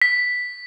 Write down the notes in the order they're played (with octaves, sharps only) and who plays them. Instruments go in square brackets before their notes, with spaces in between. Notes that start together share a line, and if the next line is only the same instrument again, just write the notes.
[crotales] B6